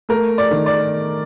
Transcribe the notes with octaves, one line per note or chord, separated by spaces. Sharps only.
A3 A#4
D5
D#3
D5